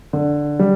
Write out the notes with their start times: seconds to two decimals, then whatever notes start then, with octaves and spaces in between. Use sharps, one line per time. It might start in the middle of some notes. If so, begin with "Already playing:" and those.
0.13 D3
0.59 G3